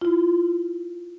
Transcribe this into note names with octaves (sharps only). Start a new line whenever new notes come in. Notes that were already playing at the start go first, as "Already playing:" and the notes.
E4 F4